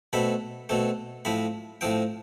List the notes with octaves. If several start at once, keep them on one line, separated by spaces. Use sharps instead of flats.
B2 A3 C4 B5
B2 A3 C4
A2 F3 C4 B5
A2 F3 C4 G5